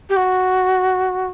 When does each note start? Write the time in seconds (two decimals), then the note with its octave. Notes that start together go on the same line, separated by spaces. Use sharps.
0.09 G4
0.16 F#4